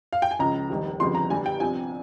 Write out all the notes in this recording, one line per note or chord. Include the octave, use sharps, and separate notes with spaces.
F5
G5
G#5
C#2 C#3 F3 A#5
F1 D#2 D#3 G3
G1 F2 C#3 F3 C6
A#5
G1 G2 G3 G#5
G5
C2 C3 F3 G#5